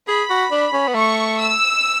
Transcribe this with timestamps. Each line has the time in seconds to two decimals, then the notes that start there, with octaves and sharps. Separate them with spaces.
0.08 G#4 B5
0.30 F#4
0.51 D4
0.73 C#4
0.87 B3
0.94 A3 C#6
1.38 E6